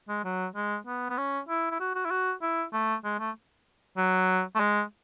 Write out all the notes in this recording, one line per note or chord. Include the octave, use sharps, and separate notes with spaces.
G#3
F#3
G#3
B3
B3
C#4
E4
E4
F#4
F#4
E4
F#4
E4
A3
G#3
A3
F#3
A3
G#3